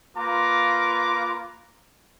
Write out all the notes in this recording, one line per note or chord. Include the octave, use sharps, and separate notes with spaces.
A#3 F4 B4 A#5 D6